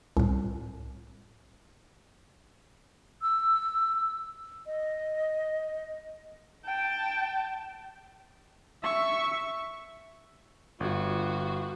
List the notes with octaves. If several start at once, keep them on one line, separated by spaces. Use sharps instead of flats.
C2 A2
E6
D#5
G5 A5
E5 C#6
G1 F4 F#4